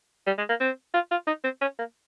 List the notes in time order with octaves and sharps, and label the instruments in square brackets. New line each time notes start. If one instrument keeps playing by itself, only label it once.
[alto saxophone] G3
G#3
A#3
C4
F4
F4
D#4
C4
C#4
A#3